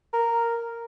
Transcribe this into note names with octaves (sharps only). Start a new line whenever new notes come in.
A#4